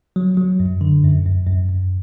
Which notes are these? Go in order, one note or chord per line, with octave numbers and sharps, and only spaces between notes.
F#3
F#3
F#2
D3
F#2
F#2
F#2
F#2